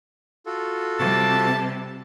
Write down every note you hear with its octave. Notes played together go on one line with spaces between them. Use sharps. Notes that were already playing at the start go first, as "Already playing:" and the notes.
F4 F#4 A4
C3 G3 A5